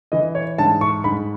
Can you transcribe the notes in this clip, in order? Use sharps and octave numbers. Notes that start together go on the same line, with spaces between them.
E3 D#5
C#5
G#2 A5
C#6
G#2 B5